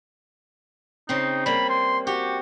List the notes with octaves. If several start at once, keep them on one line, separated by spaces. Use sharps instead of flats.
C#3 C4 D#4
G3 A#3 B5
C6
F#4 G4